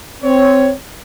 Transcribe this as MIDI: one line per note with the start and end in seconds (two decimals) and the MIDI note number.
0.23 0.71 60
0.23 0.71 73